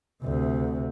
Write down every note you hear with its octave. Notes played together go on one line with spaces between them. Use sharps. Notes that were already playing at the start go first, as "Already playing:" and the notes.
D2 C3